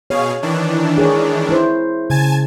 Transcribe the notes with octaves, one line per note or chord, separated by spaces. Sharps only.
B2 G#4 C#5 F5
D#3 E3 D4
G#4 A#4 C#5
E4 C5
C#3 G#5 A5 G#6